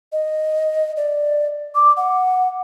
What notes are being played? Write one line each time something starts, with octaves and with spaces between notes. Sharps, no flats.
D#5
D5
D6
F#5